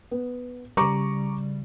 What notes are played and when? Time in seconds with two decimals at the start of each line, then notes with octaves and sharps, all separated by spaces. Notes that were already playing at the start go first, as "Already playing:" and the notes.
0.11 B3
0.77 C#3 G3 A#5 C#6 D6